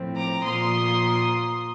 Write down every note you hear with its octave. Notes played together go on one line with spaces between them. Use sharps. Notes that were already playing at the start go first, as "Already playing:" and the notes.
Already playing: A2 F3 C4
A#5 D6
A#2 F3 A#3 F4 C6 D#6